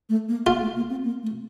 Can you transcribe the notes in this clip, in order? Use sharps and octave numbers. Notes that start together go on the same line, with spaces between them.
A3
A#3
A#3 F4
A3
A#3
C4
A#3
A3